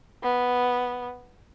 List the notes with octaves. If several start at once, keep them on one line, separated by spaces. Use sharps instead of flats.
B3